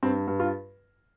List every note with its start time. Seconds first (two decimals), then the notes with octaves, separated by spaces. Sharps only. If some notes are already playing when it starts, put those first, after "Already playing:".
0.03 G2 C4
0.27 G2
0.40 F4